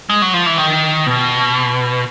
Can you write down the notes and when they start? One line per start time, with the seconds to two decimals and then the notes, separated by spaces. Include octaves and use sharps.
0.10 G#3
0.22 F#3
0.34 F3
0.46 E3
0.58 D#3
1.07 B2